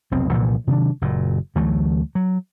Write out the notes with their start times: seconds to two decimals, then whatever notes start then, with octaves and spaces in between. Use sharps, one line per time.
0.11 F1 B1 C4
0.32 C2 A#2 E3 F3
0.67 C3 D#3 F#3 D4
1.01 F#1 A#2
1.55 D2 E3 F#3 A3
2.15 F#3